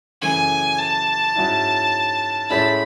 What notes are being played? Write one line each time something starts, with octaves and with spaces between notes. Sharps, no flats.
F#2 C#3 E3 A3 G#5
A5
G#2 F#3 C#4 E4
A2 G#3 C#4 E4 B5